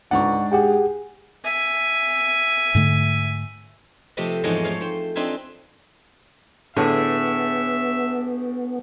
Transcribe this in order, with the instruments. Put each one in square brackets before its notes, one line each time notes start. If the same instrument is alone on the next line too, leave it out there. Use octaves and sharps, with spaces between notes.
[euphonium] C#2 [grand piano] G#2 D4 [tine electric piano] F#5 C#6
[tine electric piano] G4 F#5 G5 [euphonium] G#4
[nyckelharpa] E5 G#5
[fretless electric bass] G#2 D3 A3
[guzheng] C3 F3 A3 G4 D#5
E2 G#2 F3 G#3 C#5 D#5
A3 C#5 F5
C5 G5
C4 D4 D#4 F4 E5 G#5
[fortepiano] A2 D3 [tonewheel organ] B3 [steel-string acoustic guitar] G#4 [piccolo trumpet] E5